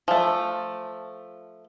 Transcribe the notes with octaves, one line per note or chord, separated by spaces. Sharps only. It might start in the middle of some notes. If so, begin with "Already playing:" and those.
F3 A3